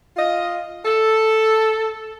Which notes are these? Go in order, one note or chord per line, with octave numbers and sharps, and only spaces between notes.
F4 D#5
A4